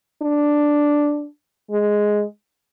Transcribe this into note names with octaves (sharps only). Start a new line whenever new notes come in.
D4
G#3